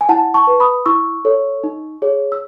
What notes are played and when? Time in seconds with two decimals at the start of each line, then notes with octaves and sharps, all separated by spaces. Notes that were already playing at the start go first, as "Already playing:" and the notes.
0.01 G#5
0.09 E4 F#5 A5
0.34 A5 C#6
0.47 B4
0.60 B5 D#6
0.86 E4 C#6 E6
1.25 A4 C#5
1.64 D#4
2.02 G#4 C#5
2.32 E6